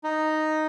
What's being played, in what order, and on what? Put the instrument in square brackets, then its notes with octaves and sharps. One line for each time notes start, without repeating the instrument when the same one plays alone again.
[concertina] D#4